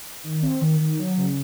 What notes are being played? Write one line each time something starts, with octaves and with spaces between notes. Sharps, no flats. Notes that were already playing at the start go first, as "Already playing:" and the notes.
D#3
C4
D#3
D#3
F#3
C#3